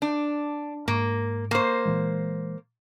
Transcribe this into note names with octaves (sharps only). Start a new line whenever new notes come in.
D4
G#2 A#3
A#3 C5
A#2 E3 G#3